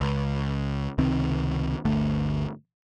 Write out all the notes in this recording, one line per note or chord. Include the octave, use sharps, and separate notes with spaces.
C#2
C#2 C3 D#3 C4
G1 D2 A3